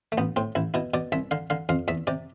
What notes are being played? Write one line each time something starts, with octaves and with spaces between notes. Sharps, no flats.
A3
A1 B3
A2 C4
A1 E4
B2 E4
B2 D5
C2 E5
D3 F5
D3 F5
F2 F5
E2 E5
C3 D5